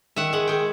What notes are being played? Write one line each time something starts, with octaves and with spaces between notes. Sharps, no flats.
D#3 E5 F#5
G#3 F#5
G#3 G5